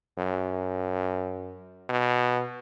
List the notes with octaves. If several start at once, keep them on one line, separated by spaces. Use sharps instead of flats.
F#2
B2